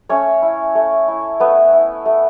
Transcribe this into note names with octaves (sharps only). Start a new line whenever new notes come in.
A3 C#4 C#5
E4
A3
E4
A3 B3 B4
E4
A3